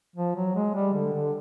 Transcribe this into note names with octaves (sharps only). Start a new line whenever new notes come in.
F3
F#3
G#3
G3
D3
D3